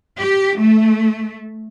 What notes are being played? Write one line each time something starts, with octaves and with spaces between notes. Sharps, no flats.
G4
A3